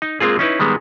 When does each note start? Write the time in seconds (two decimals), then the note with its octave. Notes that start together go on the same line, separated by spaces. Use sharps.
0.02 D#4
0.20 G#3 A#3 C4 F4 G#4
0.39 C#4 D#4 E4 B4
0.60 D#3 G3 G#3 B3